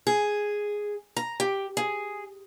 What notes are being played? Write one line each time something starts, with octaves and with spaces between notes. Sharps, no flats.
G#4
A#5
G4
G#4